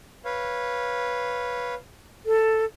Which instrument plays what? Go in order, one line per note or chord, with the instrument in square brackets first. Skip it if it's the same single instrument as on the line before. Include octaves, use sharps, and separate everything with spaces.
[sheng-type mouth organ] B4 C#5 F5
[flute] A4